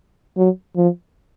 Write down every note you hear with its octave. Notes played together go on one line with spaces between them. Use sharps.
F#3
F3